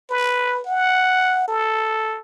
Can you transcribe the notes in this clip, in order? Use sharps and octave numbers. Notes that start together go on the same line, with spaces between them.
B4
F#5
A4